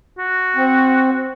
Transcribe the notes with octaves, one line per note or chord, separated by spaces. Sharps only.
F#4
C4